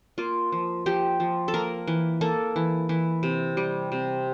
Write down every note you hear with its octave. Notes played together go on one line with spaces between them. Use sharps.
A#3 F4
F3
F3 G4
F3
A4
A#3 A#4
E3
A#3 A4
E3
E3
C3
G3
C3